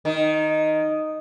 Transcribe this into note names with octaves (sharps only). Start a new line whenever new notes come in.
D#3